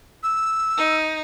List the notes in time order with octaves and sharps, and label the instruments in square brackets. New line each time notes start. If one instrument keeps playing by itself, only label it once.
[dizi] E6
[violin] D#4